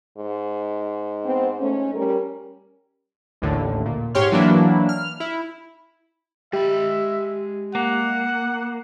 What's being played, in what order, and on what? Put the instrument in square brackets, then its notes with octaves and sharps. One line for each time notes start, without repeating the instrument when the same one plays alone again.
[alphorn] G#2
[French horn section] B3 C4
A3 C#4
G3 C#4 A#4
[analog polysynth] A1 D#2 A2 D3
A#2
G#2 G4 C#5 C6 F6
E3 F#3 A#3 D4 E4
F6
E4
[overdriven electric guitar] G#3 B5 [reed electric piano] G4 [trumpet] E5
[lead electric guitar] A#3 [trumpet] F#5